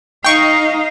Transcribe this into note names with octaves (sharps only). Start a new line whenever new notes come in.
D#4 D#5 F5 G5 C#6